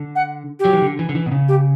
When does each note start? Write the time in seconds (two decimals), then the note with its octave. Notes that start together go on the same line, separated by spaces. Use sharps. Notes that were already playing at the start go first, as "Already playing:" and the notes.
Already playing: D3
0.15 F#5
0.59 G4
0.65 F#3
0.73 E3
0.82 D3
0.99 E3
1.09 D3
1.15 E3
1.26 B2
1.32 C#3
1.48 G4